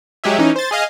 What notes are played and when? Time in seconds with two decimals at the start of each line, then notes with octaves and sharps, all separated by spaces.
0.24 F#3 G#3 G4 G#4 E5
0.38 E3 C#4 D#4
0.56 C5 A6
0.71 G#4 D#5 F5